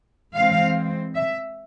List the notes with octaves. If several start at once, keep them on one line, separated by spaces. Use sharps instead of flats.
E3 G#3 C4 F5
E5